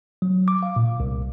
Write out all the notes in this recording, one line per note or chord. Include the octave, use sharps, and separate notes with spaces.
F#3
D6
F5
A#2
C2